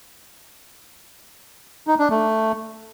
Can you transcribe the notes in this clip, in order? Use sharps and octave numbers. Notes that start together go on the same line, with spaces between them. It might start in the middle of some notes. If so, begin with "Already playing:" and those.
D#4
D4
A3